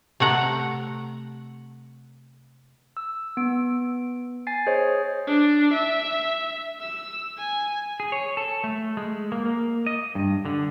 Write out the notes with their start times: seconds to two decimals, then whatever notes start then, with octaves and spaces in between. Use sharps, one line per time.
0.20 C3 A3 F#5 A#5
2.97 E6
3.37 B3 D7
4.47 G#5 A6 C7
4.67 G#4 C5 C#5 D#5
5.27 D4
5.73 E5
6.81 E6
7.38 G#5
8.00 G#4
8.12 C#5
8.37 A4
8.64 A3
8.97 G#3
9.32 A#3
9.46 A#3
9.86 D#5
10.15 G2
10.45 D3